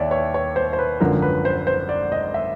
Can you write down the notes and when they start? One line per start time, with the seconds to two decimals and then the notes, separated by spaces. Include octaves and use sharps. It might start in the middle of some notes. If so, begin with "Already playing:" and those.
Already playing: D#2 C#5 D5 E5
0.11 C#5
0.34 C#5
0.56 C5
0.73 C5
0.79 B4
1.00 G#1 F#2 D3 F3 A#4
1.22 B4
1.45 C5
1.67 C5
1.89 D5
2.12 D#5
2.34 E5